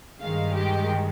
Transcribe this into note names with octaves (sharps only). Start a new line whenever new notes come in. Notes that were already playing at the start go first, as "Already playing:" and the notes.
G2 D#3 G#3 F5
G4